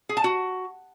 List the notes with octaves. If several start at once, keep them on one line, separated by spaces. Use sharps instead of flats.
G#4
A5
F#4